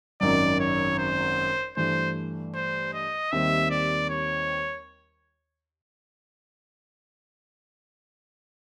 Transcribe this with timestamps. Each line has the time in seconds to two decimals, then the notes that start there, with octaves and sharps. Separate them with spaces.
0.21 G#1 F#2 D#3 F#3 D5
0.60 C#5
0.98 C5
1.77 G2 E3 A3 C5
2.54 C5
2.94 D#5
3.32 D#2 D#3 G3 C4 E5
3.71 D5
4.09 C#5